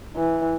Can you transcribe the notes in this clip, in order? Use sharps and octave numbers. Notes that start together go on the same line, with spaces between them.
E3